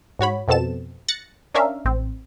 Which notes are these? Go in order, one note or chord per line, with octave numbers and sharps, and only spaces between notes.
G#2 F#4 C#5 B5
F2 B2 C4 A4 A5 E7
F#6 A6 A#6 C#7
C#4 D4 A#4 E5 F5
A1 C4